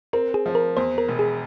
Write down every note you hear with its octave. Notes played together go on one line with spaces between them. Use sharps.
C4 A#4
G#4
F3
A#4
E2 C5
A#4
E1
G#4